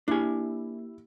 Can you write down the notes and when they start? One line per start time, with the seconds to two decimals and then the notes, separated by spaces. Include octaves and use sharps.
0.08 A#3 D4 E4 G4 G#5